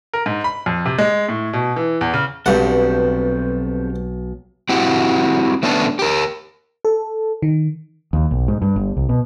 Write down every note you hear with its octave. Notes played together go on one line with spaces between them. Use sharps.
A#4
G#2
B5
F2
C3
G#3
A2
B2
E3
E2
C#3
B1 G2 C4 G4 A4 F#5
C4 E4 F#4 G4
A3 B3 C#4 D4 A4
G4 A#4
A4
D#3
D#2
B1
G#2
G2
G1
C2
B2